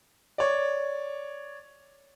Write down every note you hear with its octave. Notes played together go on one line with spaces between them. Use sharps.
C#5 D5